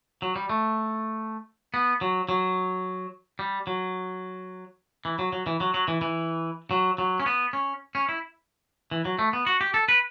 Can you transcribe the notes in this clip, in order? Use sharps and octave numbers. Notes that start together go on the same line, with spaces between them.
F#3
G3
A3
B3
F#3
F#3
G3
F#3
E3
F#3
F#3
E3
F#3
F#3
E3
E3
F#3
F#3
C#4
B3
C#4
C#4
E4
E3
F#3
A3
B3
F#4
G4
A4
B4